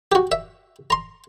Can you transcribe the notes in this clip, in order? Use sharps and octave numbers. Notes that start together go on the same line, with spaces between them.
F#4 G4
E5
A#5 C6